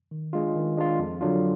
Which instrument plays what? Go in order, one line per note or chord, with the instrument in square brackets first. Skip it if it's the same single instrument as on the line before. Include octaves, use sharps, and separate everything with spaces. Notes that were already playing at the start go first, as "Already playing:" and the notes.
[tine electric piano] D#3
G#3 D4 F4
D#3
G#3 D4 F4
F2
D3 F#3 D4 F4